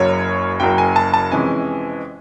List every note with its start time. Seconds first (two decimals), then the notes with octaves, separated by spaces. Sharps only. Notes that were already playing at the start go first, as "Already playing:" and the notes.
Already playing: F#1 F#2 C#3 F#3 A#3 C#5
0.60 F#1 F#2 C#3 F#3 A#3 G5
0.78 G#5
0.96 A5
1.14 A5
1.32 F2 C3 E3 G#3 C#4 G#5